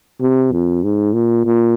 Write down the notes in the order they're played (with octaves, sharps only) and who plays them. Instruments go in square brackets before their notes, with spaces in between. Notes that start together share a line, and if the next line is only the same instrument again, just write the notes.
[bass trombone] C3
F2
G#2
A#2
A#2